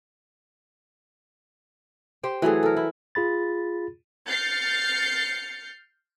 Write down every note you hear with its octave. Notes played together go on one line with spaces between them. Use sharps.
G4 C5 G5
E3 F#3 A3 G#4
A4 A#4
E4
F4 G#4 B5 A6
F6 G6 A6 C7 C#7